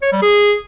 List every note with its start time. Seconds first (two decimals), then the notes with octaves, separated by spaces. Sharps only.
0.02 C#5
0.12 G3
0.22 G#4